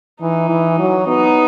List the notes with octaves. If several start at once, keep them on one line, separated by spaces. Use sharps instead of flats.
E3 D#4
E3
F#3
B3 D#4